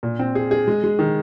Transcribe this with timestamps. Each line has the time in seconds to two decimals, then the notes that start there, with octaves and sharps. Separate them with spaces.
0.03 A#2
0.19 C4
0.35 G#4
0.51 G#4
0.68 G#3
0.84 G#3
0.99 D#3